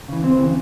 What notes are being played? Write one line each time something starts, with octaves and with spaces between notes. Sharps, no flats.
C#3 E3
D#2 C4
C#3 E3